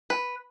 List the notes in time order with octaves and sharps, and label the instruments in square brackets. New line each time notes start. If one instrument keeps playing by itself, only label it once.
[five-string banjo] B4